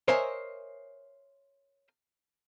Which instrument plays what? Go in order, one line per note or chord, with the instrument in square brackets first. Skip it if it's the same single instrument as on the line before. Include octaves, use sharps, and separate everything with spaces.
[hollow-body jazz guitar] A#4 C5 C#5 D#5 E5 G#5